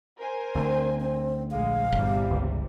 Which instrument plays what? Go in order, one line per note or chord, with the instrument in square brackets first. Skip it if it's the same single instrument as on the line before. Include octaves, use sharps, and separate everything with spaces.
[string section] A#4 C5 G#5
[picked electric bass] D2 [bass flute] C4
[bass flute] C4
[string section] A#1 G#3 [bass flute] F5
[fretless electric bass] G1 [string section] C3 E3 G3
[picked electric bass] C#2